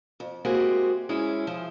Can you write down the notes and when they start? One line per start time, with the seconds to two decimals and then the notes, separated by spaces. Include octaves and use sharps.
0.20 F2
0.45 G#3 A#3 C4 E4 F#4 G4
1.09 G#3 C#4 E4
1.47 F3